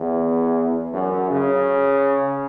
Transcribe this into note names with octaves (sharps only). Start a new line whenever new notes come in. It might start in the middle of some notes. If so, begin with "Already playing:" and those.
Already playing: E2
F#2
C#3